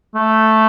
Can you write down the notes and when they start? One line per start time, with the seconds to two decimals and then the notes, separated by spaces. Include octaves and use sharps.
0.15 A3